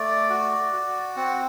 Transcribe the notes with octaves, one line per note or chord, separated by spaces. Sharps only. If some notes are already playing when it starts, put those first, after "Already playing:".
Already playing: A3 D5
F#4
F#4
C4 F#5